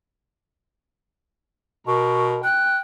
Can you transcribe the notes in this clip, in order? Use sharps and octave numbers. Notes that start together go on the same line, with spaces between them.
B2 A#4 C#6
G5 F#6